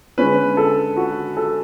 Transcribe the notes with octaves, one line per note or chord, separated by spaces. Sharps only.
D3 G#3 C#4 B4
A4
F#4
A4